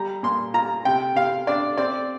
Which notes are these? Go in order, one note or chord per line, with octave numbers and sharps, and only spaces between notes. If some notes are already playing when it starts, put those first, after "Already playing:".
Already playing: G3 A#5
A#2 C6
F4 A#5
C3 G5
C3 F5
D4 D5
C4 D5